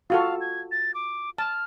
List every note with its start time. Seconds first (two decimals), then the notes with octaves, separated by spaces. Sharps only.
0.10 F4 F#4 A4 F5
0.41 G#6
0.72 A6
0.94 D6
1.38 A5 F6